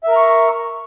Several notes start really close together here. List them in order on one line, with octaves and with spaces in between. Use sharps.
E5 A#4 A#5 C#6